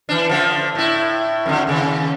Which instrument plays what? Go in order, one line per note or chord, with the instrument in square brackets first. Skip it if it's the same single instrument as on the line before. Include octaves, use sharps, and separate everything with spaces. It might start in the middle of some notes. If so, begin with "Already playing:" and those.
[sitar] E3 D4
D3 F3
A2 E4
F2 A2 D3
D#2 C#3